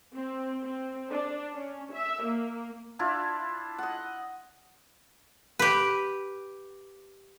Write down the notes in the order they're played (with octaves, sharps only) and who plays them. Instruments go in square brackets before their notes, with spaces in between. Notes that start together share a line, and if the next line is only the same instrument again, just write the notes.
[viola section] C4
C4
D4
C#4
E5
A#3
[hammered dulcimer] D4 E4 F4
D#5 F#5
[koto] G4 B4